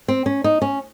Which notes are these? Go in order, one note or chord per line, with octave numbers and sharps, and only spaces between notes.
C4
C#4
D#4
C#4